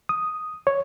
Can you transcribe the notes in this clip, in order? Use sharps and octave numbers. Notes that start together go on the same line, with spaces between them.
D#6
C#5